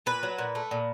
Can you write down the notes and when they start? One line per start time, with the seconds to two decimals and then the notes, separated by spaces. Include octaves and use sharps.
0.06 A#2 B4
0.23 F#3
0.38 A#2
0.55 A3
0.71 A#2